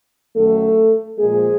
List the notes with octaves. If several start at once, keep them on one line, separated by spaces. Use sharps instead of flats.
F#2 D#3 F#3 A3 A4
A#2 F3 G#3 A#3 G#4